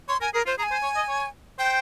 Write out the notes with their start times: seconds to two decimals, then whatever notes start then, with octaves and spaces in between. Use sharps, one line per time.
0.09 C#5 C6
0.21 A#4 G#5
0.34 G#4 A#4
0.46 F4 C5
0.58 G#4 A#5
0.63 G#5
0.71 C5
0.83 C#5
0.96 D#5
1.09 C#5
1.59 C5 G5